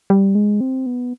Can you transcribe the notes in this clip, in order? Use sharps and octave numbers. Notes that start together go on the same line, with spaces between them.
G3
G#3
C4
B3